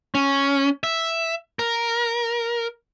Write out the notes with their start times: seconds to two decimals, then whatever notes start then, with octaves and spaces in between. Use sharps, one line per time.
0.15 C#4
0.84 E5
1.59 A#4